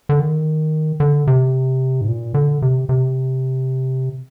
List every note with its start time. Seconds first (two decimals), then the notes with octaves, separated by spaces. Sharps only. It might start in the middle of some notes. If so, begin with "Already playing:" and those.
0.09 D3
0.20 D#3
1.00 D3
1.27 C3
2.01 G#2
2.08 A#2
2.34 D3
2.62 C3
2.89 C3